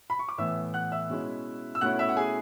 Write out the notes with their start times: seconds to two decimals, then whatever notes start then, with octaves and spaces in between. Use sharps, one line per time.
0.10 B5
0.19 C#6
0.29 D6
0.38 A2 E3 B3 E5 E6
0.74 F#5 F#6
0.92 E5 E6
1.09 B2 G#3 C#4 E4
1.75 E6
1.81 B2 A3 C#4 E4 F#5 F#6
1.99 E5 E6
2.09 F#5
2.17 G#4 G#5